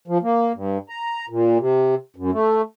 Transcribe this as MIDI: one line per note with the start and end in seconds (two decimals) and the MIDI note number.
0.08 0.18 53
0.23 0.52 58
0.54 0.78 43
0.89 1.26 82
1.29 1.58 46
1.59 1.95 48
2.16 2.31 42
2.32 2.62 57